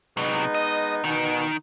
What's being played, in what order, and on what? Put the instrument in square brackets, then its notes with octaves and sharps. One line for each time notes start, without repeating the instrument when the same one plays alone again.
[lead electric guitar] C3 F#3 [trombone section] G#3 B3 D#4
[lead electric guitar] D#5
[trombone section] B2 [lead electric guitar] D#3 D#4